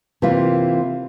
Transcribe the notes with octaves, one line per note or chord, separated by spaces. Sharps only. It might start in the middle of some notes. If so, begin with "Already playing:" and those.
C3 E3 A#3 F4